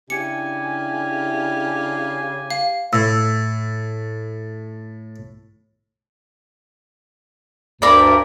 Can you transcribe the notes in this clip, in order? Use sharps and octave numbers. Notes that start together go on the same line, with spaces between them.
C#3 D4 E4 G4 G#5 C#7
F5
A2 E6
D2 G2 A#4 D5 B5